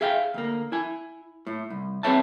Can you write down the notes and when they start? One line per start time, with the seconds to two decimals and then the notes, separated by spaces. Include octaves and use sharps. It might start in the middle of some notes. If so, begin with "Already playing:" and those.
0.01 G#4 E5 F5 G5
0.34 D2 A#3
0.72 E4 G#5
1.47 A2
1.70 C2
2.03 C4 G#4 B4 C#5 E5 A5